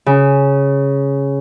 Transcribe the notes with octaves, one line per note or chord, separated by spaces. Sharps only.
C#3